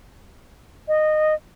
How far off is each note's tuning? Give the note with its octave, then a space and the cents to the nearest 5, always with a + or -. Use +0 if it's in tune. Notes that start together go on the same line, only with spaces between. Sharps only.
D#5 -15